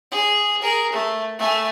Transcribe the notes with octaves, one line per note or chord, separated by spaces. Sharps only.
G#4
G#4 A#4
A3
A3 G#5